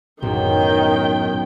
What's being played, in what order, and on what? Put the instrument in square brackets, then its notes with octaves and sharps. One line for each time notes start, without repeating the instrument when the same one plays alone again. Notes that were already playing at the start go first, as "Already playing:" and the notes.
[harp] B1 F#2 [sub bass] A2 [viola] D#3 G5